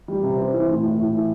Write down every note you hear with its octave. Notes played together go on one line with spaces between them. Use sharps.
G3
C3
C4
E3
A2
A2
A2
E3